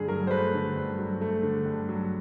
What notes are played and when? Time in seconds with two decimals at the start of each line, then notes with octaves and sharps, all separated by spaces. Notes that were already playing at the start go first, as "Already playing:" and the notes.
Already playing: G2 D3 A3 G#4
0.08 F#3 A#4
0.27 C5
0.31 A3 B4
0.54 D3
0.76 G2
0.98 F#3
1.21 A3
1.43 D3
1.65 G2
1.89 F#3